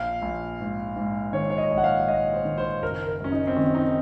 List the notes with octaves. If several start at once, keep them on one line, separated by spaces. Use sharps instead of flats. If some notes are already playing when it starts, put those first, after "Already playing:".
Already playing: A#1 F5
A#1
G#2
G#2
D#3 C#5
C#5
D#5
A#1
F#5
F5
A#1 D#5
C5
D#3
C5
F#1 A#4
A#4
F#2 C#4
D#4
C4
D#3 C#4
D#4